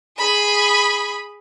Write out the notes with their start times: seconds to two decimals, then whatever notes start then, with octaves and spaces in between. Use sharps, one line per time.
0.18 G#4 B5